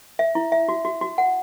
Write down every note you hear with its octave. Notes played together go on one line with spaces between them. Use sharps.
E5
E4
E5
F#4
F#4
F#4
F#5